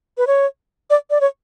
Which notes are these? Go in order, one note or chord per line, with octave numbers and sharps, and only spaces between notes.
B4
C#5
D5
D5
C#5